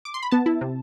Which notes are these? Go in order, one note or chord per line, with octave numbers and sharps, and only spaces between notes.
D6
C6
B5
B3 A5
E4
C3